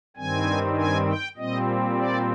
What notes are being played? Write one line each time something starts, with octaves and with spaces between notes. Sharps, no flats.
G2 D#3 G3 C4 G#5
G#5
G5
A#2 G3 C4 D#5
D5